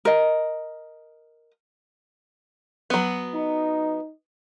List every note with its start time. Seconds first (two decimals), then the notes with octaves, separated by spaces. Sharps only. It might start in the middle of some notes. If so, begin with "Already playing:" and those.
0.05 A#4 D#5
2.90 F#3 B3
3.35 D#4